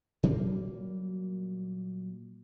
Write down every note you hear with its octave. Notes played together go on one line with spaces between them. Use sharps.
A#2 F#3 G3 A#3